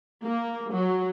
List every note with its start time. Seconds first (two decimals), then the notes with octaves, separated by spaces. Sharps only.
0.23 A#3
0.73 F#3